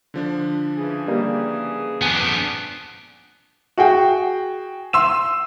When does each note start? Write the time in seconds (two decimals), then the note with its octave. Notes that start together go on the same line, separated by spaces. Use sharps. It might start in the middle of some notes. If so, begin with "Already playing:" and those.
0.14 D3 F3 D4
0.77 C#3 E3 G#4
1.08 G3 A#3
2.01 F2 B3 D4 G#5
3.78 F#4 G#4 G5
4.93 C6 E6 E7